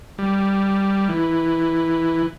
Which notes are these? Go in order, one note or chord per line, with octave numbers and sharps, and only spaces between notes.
G3
E3